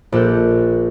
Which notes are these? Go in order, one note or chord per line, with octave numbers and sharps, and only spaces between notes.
A#1 A#2 A4 F#6 G6